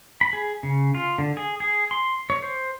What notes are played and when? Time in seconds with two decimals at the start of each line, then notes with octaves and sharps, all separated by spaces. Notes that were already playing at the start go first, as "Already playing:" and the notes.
0.21 B5
0.33 G#4
0.63 C#3
0.95 F4
1.18 D3
1.37 G#4
1.60 G#4
1.91 C6
2.30 C#5
2.42 C5